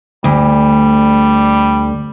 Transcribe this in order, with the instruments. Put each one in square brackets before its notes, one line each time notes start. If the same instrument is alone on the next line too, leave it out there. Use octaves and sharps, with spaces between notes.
[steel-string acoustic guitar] D2 [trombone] G3